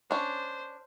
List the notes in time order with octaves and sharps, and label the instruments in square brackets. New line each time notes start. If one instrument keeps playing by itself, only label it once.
[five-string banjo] C#4 D4 [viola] C5